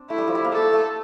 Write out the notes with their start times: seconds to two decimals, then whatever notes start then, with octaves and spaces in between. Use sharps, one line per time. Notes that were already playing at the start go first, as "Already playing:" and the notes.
Already playing: C4 D4
0.10 A3 E4
0.18 G3
0.28 F3
0.35 G3
0.45 A#3
0.52 A3 A4
0.73 A3